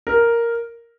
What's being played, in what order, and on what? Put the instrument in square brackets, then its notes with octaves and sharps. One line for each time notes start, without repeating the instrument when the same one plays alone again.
[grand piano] A#4